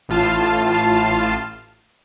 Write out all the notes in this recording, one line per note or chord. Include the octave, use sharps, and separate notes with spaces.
A1 A2 F4 A5 F6 C7